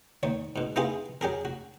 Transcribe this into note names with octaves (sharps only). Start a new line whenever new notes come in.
D#2 C#5
G#2 B2
A#3 B3 E4 F4 G4 G#4
F#3 G4 G#4 A#4
F#4